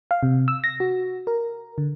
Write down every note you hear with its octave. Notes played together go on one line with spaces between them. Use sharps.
F5
C3
E6
A#6
F#4
A#4
D3